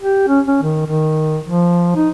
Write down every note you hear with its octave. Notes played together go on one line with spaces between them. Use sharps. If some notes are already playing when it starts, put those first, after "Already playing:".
G4
C#4
C#4
D#3
D#3
F3
D#4